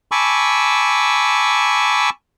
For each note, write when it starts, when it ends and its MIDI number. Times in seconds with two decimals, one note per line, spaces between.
0.12 2.10 80
0.12 2.10 81
0.12 2.10 83
0.12 2.10 85
0.12 2.10 86
0.12 2.10 88